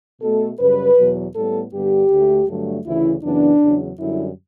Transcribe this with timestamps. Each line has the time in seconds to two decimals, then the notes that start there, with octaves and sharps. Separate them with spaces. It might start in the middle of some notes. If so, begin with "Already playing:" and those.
0.22 B2 A3 A4
0.59 F#2 C#3 G3 B4
0.97 E2 B2 F#3
1.35 A2 G3 B3 A4
1.73 G2 D3 G3 B3 G4
2.11 D2 D3 A3
2.48 G2 D3 F#3 A3
2.86 D2 C#3 E3 E4
3.23 F#2 C#3 E3 B3 D4
3.62 E2 C#3 F#3
3.99 F#2 D3 G3 E4